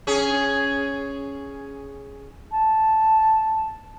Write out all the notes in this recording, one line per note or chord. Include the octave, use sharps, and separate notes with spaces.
C#4 G#4
A5